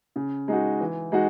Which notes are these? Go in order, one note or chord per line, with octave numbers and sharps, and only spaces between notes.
C#3
G#3 D#4 F#4
E3
G#3 D#4 F#4